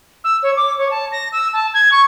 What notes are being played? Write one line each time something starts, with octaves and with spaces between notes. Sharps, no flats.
E6
C#5
D6
C#5
A5
A#6
E6
A5
G#6
C#6